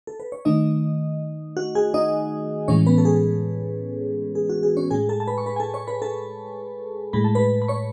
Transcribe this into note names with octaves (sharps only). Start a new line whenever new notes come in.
A4
B4
C#5
D#3 A3 D#4 D#5
F#4 F#5
G#4 G#5
D#4 D#5
A2 E3 G#3 C#4 C#5
B3 B4
A4
G#4
G#4
F#4
G#4
C#4 C#5
A2 G#3 G#4 G#5
A4 A5
A5
B4 B5
C#6
B4 B5
G#5
A4 A5
C#5 C#6
B4 B5
A4 A5
A2 G#3 B5
A5
B4 B5
B5
C#5 C#6